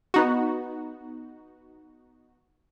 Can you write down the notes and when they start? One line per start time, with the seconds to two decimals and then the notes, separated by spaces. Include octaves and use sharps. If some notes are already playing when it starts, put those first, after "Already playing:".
0.14 B3 D#4 F#4